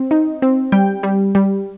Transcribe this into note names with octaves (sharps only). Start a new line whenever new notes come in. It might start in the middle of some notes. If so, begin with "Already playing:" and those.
Already playing: C4
D#4
C4
G3 G5
G3
G3